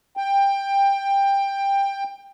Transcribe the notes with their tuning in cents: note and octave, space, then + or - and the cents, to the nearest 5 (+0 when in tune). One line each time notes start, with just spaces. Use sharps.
G5 +15